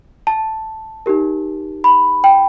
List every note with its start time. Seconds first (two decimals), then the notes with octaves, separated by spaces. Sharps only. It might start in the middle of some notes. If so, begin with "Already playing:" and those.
0.27 A5
1.06 D#4 G4 A#4
1.84 B5
2.24 G5